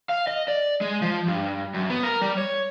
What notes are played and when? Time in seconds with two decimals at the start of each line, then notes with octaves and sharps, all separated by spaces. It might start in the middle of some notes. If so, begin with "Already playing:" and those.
0.09 F5
0.27 D#5
0.48 D5
0.81 G#3
1.02 F3
1.28 G2
1.74 F#2
1.90 B3
2.03 A#4
2.22 G3
2.38 C#5